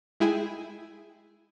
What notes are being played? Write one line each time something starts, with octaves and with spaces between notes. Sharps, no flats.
G#3 E4 G#4 G5 G#5